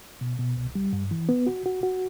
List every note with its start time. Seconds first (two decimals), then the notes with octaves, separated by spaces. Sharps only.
0.21 B2
0.39 B2
0.57 C2
0.75 G3
0.93 G2
1.11 E3
1.29 B3
1.47 F#4
1.66 F#4
1.83 F#4